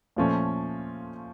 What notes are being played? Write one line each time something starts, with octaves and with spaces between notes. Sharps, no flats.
A#2 F3 A3 C#4